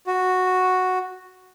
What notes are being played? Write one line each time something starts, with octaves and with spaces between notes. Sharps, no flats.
F#4